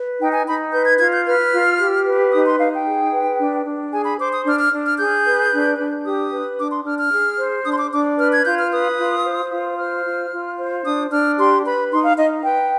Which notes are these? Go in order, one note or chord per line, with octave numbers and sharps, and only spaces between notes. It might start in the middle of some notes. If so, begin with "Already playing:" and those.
Already playing: B4
D#4 G5
G#5
D#4 B5
B4 G6
G#6
F4 G#6
G6
B4 F6
F4
G4
B4
D#4 D#6
C6
D#4 F5
G5
G#4
B4
D4
D4
G#4 G#5
B5
C5 D6
D#6
D4 F6
F6
D4
F6
G#4 G6
B4
D4
D4
G4 D#6
B4
D4 D6
C6
D4 F6
F6
G#4
C5
D4 D#6
C6
D6
D4 D6
B4 F6
G#6
F4 G6
F6
B4 D#6
F4
C5
F4
C5 F6
F4
F4
C5
D4 D#6
D4 F6
G4 C6
B4 B5
D#4 C6
F5
D#4 D#5
B4 G5